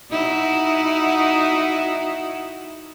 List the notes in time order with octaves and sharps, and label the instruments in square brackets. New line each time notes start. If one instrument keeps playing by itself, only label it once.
[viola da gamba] D#4 E4 F#4